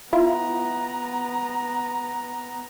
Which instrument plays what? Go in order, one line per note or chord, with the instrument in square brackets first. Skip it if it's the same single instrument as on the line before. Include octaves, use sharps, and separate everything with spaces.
[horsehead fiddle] B3 A#5 [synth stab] E4 F4